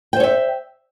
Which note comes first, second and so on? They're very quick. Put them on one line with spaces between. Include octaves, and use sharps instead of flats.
G5 C5 C#5 E5